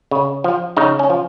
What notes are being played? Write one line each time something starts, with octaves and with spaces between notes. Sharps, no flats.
C#3
F3
C#3 D#4
C#4
F3